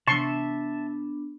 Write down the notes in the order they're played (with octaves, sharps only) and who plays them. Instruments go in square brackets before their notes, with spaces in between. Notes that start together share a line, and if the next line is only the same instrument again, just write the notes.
[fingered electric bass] C3 E3 [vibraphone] B3 D4 [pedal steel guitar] E5 A5 [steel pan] C6 C#6